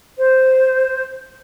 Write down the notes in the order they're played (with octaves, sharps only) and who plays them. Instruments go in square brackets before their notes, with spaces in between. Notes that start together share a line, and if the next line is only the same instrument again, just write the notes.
[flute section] C5